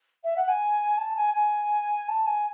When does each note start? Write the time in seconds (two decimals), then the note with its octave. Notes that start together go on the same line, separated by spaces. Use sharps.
0.23 E5
0.36 F#5
0.48 G#5
0.97 A5
1.16 G#5
1.34 G#5
2.08 A5
2.26 G#5